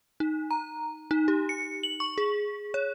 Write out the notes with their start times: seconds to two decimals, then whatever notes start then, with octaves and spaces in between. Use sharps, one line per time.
0.20 D#4
0.51 A#5
1.11 D#4
1.28 G4
1.49 C#7
1.83 F#7
2.00 C#6
2.18 G#4
2.74 C#5